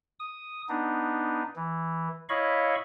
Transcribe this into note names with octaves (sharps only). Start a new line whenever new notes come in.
D#6
B3 D4 D#4
E3
E4 C#5 D#5 F5 B5 C#6